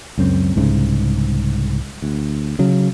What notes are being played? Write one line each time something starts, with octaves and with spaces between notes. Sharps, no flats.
C#2 F#2 C4
C2 G#2 C#3
D2
C#3 F#3